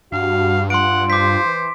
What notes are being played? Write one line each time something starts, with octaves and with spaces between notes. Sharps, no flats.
G2 F#4 F5
F4 F#5 C6 D7
C5 D6 B6
E3